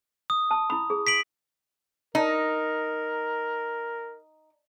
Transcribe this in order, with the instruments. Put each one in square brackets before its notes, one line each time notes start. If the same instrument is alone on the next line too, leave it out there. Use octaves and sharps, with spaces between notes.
[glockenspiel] D#6
[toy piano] A5
E4 B5
G#4
[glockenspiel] B6 D7 F#7
[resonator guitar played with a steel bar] D#4 [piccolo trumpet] A#4